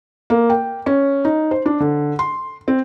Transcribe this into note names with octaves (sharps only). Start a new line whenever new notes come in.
A#3
G5
C#4
D#4
C5
D4
D3
C6
C4